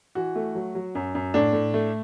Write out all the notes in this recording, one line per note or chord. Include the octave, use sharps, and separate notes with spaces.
E3 F#4
A3
F#3
F#3
F#2
F#2
A2 D4
A2
A3